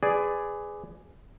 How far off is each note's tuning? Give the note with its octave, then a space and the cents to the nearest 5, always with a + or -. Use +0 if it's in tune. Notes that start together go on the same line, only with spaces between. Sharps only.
G#4 +0 B4 +25 D5 +0